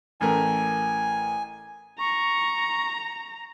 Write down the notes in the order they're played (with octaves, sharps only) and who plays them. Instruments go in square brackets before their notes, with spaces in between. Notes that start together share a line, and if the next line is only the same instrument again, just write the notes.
[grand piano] A1 A3 A#4 [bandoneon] G#5
[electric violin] A#5 [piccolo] C#6